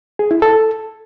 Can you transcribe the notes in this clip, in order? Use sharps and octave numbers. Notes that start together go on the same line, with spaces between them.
G#4
E4
A4